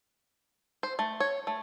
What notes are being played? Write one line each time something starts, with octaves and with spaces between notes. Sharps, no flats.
C5
A3
C#5
A3